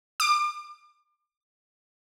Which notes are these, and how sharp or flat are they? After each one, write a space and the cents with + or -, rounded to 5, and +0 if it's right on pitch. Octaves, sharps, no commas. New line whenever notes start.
D6 +35